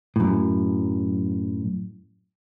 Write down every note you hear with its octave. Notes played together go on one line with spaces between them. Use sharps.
F#2 A2